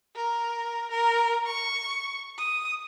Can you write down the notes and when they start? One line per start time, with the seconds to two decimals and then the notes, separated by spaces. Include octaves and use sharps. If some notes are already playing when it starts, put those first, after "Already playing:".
0.16 A#4
0.91 A#4
1.46 C#6
2.38 D#6